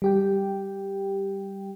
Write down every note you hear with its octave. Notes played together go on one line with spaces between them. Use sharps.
G3 G4 G5